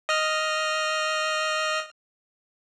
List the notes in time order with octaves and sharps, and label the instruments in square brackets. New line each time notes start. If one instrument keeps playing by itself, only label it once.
[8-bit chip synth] D#5 F6